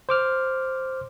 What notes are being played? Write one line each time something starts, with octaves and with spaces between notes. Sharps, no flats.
C5 D6 F6